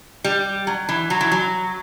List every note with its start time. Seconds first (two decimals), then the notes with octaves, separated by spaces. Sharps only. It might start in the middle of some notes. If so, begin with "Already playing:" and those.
0.24 G3
0.67 F#3
0.89 E3
1.10 F#3
1.21 E3
1.32 F#3